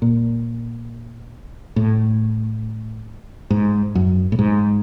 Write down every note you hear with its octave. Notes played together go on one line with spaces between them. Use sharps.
A#2
A2
G#2
F#2
A2
G#2